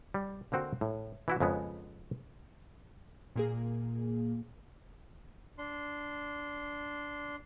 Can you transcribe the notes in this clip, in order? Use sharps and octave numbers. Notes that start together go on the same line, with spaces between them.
G3
D3 A#3 C4 F#4
A2
E3 E4 F#4
F2 C#3 G#3 B3
A#2 A#3 G#4
D4 C6